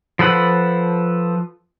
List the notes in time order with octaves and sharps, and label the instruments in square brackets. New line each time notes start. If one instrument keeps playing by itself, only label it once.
[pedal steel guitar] F3 A4 B4 F#5